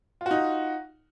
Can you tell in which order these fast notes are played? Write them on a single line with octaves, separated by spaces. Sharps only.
F4 F#4 D#4